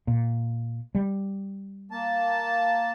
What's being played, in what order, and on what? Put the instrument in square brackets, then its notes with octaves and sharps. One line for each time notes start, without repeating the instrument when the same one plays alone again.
[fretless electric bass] A#2
G3
[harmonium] A#3 A5